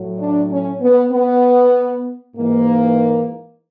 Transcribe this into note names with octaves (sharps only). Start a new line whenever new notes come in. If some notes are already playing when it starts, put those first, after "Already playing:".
Already playing: A2 F#3
D4
C#4
B3
B3
G#2 E3 A#3